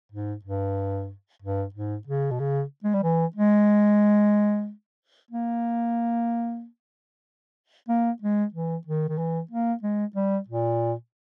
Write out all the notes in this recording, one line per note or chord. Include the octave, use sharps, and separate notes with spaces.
G#2
G2
G2
G#2
C#3
B2
C#3
G#3
G3
E3
G#3
A#3
A#3
G#3
E3
D#3
D#3
E3
A#3
G#3
G3
A#2